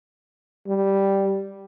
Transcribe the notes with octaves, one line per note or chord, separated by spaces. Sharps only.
G3